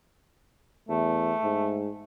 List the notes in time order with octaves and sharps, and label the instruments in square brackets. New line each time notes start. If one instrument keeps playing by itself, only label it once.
[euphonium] E2 [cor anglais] A3
[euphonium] G#2